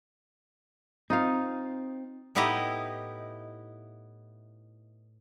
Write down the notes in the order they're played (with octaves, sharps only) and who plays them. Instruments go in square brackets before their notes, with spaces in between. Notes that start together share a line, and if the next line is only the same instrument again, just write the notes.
[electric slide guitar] C4 [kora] D#4 F4 F5
[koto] A2 B3 D#4 E4 G4 D#5